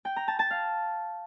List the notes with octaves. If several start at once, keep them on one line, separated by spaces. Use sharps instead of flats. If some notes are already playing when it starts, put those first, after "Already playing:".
G5
A#5
A5
A5
F5